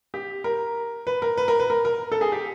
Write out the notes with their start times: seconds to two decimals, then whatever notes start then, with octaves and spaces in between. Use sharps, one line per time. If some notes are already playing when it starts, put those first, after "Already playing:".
0.14 G4
0.44 A#4
1.07 B4
1.22 A#4
1.37 B4
1.48 A#4
1.60 B4
1.70 A#4
1.85 A#4
2.12 A4
2.21 G#4
2.32 G4